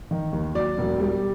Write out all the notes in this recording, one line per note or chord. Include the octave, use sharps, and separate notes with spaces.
D#3
D#2
F#3 D5
E1
G3